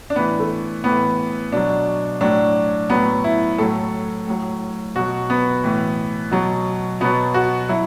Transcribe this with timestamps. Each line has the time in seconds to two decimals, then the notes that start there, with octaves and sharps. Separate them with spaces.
0.10 D4
0.16 A2 B3
0.19 E3
0.39 A3
0.84 A2 E3 B3
1.52 B2 F#3 D4
2.21 A2 F#3 D4
2.90 A2 F#3 B3
3.24 E4
3.58 A2 F#3 A4
4.27 A2 F#3
4.95 B2 F#3 F#4
5.30 B3
5.64 A2 E3
6.31 B2 F#3
7.01 B2 F#3 B3
7.34 F#4
7.69 F#3 E4